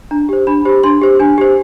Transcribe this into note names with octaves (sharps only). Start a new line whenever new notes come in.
D4 A#5
G4 C5
D4 B5
G4 C5
D4 C6
G4 C5
D4 G#5
G4 C5